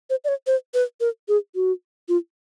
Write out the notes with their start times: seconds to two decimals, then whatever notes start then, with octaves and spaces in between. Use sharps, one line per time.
0.10 C5
0.24 D5
0.28 C#5
0.47 C5
0.74 B4
1.01 A#4
1.28 G#4
1.55 F#4
2.09 F4